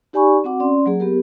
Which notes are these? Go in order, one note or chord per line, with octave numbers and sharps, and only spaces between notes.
D#4 G4 D5 G#5 B5 C#6
C4 F#4 F#5 D6
C#4 D5 C6
F#3 A#3 G#4
B3 G4 A#4